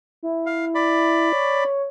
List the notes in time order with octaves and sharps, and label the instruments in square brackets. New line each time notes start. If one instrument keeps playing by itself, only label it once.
[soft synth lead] E4
[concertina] F5
D5 B5
[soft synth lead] C#5